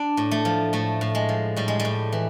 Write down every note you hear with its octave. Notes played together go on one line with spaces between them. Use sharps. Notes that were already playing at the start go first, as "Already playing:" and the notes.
Already playing: D4
A2
A3
F3
A2 A3
A2
G#3
F3
A2 G3
G#3
G3
A2
E3